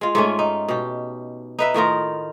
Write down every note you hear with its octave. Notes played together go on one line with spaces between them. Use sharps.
G#3 F4
G#2 A3 C#4
D#4
B2 G4
D#4 B4 E5
A2 D#3 F4 A#4